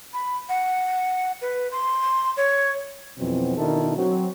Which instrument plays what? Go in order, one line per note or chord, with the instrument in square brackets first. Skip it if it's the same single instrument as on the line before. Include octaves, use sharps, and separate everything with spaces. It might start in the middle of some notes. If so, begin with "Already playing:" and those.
[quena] B5
F#5
B4
C6
C#5
[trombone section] F2 B2 E3 F#3 C4
B2 D#3 D4 E4 A4 A#4
F#3 C4 F#4